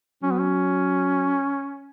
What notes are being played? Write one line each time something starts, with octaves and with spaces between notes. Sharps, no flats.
F#3 C#4
B3
C#4